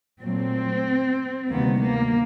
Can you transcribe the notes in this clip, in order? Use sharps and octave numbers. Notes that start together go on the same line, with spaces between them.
A#2 F#3 A3 C4
D2 C3 D#3 G3 A#3 B3
A#3